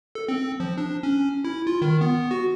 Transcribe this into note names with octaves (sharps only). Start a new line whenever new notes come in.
A4
C4
F3
D4
C#4
E4
F4
D#3
B3
F#4